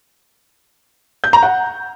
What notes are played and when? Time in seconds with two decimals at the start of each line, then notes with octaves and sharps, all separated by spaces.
1.24 G6
1.33 A#5
1.43 F#5